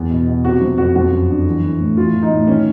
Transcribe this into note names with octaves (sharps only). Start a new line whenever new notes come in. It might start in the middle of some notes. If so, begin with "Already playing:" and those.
Already playing: E2
B2
B2
C3 F#4
F3
F2 F#4
F3 F#4
F#2
D3
E3
E3
A2
E3 F4
E3
D#4
A2
D#3 C#4